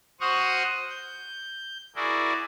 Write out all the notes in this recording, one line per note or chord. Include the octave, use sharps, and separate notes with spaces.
F#4 C5 F#5 C#6 D#6 F6
G6
E4 F#4 G#4 A#4 D5